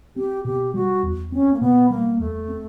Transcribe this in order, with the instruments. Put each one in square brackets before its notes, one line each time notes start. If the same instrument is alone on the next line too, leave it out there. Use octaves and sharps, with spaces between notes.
[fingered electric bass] C4 [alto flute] G4
[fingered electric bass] B2 [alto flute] G4
[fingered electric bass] G3 [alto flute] F#4
[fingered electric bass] E2
[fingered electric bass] C4 [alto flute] C#4
[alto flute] A#3
[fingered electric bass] B2 [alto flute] B3
[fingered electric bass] G3 [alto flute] A#3
[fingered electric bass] E2 [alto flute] A3
[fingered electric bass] C4